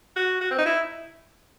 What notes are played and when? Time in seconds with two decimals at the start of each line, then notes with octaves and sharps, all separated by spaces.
0.16 F#4
0.41 F#4
0.51 C4
0.58 D#4
0.66 E4